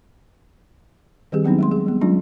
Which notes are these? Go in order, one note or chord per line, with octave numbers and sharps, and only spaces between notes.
D#3 G3 C4 G4 G#4
F#3 B3 C4 D4 D#4
G#3 A3 C6
G#4
G3 B3
F#3 G#3 C#4 D4 F4